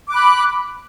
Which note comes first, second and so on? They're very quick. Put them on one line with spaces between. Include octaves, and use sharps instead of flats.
D6 F#6 B5